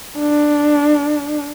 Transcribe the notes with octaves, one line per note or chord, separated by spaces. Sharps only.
D4